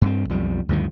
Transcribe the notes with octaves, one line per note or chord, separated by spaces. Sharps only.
G2 B3 C4
B1 F2 G3
D2 G2 D#3 F3